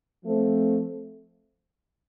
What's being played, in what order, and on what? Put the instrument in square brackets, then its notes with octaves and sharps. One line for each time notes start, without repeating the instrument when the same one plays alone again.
[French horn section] F3 A3 C4